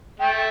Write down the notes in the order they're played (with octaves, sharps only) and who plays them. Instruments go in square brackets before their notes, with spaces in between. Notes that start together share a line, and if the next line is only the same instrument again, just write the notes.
[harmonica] A3 [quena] G5